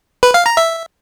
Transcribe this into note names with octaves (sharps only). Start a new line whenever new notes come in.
B4
F5
A#5
E5